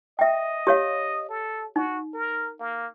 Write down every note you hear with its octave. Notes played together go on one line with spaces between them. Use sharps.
D#5 E5 G5
G4 C#5 F5
A4
D#4 F#4
A#4
A#3